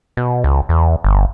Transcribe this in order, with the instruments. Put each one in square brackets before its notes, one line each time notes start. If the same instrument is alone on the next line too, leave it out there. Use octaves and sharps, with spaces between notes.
[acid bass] B2
C#2
E2
G1